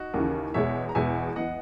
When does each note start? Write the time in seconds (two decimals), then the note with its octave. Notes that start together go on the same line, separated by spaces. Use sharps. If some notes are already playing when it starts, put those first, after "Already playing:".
Already playing: D#4 F#4
0.14 D#2 C#3 E3
0.54 E2 B2 G#3 C#5 E5
0.89 A#5
0.95 E2 B2 G#3 E5 G#5
1.36 E3 B3 D#5 F#5